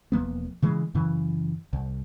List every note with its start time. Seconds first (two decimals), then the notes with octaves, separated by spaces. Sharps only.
0.12 E1 F3 A#3 B3
0.62 C#3 E3 G#3
0.94 F#2 C#3 E3
1.73 C2